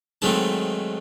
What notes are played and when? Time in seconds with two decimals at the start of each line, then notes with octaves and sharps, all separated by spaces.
0.22 G#2 D#3 F#3 A3 C4 A5